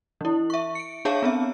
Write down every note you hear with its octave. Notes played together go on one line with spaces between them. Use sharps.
E3 E4
E5 C#6
C#7 D7
D4 G#4 C#5 E5 F5 A5
B3 C4 E5